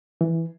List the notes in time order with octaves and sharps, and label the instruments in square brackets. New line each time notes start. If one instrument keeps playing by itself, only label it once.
[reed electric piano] E3